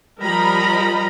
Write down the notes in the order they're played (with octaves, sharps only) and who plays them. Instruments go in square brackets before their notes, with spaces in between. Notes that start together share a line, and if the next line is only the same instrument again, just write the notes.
[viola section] F3 G3 A#4 D#5 A#5 B5